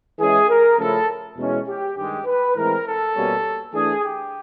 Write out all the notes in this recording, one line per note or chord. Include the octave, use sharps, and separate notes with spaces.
E3 G#3 C#4 E4 G#4
A#4
C#3 F3 A3 C#4 E4 A4
E2 B2 G#3 C#4 E4
G4
G2 D#3 G#3 G4
B4
A2 E3 G#3 C4 A#4
A4
B2 G3 A#3 C#4
E3 A3 D4 G#4
G4